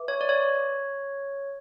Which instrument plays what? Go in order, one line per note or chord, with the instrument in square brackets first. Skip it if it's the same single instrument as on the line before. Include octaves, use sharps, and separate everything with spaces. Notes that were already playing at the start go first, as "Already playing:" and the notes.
Already playing: [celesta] B4 E5 D6
[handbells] C#5
D5
C#5